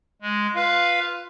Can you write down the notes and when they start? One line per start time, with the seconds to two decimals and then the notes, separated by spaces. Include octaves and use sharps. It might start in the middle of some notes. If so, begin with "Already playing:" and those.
0.22 G#3
0.55 F4 B4 F5